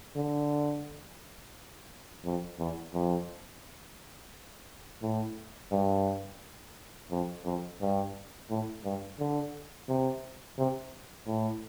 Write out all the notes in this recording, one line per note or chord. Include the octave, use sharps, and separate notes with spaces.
D3
F2
E2
F2
A2
G2
F2
F2
G2
A2
G2
D3
C3
C3
A2